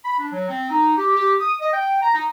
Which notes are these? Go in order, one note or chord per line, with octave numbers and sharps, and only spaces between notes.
B5
D4
F#3
C4
D#4
G4
G4
D#6
D#5
G5
A#5
D#4